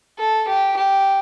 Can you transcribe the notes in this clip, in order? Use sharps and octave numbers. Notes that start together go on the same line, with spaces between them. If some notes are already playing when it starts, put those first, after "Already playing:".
A4
G4
G4